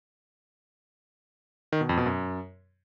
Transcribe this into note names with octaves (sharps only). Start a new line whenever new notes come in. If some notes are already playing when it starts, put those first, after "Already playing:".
D#3
B2
F2
B2
F#2